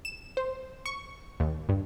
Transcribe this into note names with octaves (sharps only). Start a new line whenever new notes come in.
E7
C5
C#6
D#2
G2